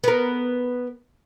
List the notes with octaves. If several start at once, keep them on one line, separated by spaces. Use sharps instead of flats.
B3 A#4